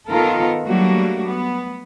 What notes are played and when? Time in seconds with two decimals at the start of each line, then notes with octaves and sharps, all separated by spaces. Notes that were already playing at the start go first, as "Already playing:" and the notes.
0.10 D#3 B3 F4 A4 A#4
0.67 F#3 G3 A3 A#3 D4 F#4
1.25 B3